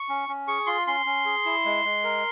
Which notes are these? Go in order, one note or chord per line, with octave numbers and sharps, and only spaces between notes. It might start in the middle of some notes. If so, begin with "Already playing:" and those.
Already playing: C#6
C#4
C#4
G#4 C#6
F4 C6
C#4 C6
C#4
G#4
E4
G#3
G#3
A#4